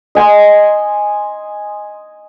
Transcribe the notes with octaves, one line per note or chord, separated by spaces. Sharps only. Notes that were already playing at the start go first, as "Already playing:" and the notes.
D#5 G#5 C6